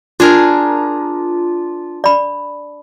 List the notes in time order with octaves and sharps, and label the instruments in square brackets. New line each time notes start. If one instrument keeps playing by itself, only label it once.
[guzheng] D4 G#4 A#4 [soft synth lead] F4
[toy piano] D5 B5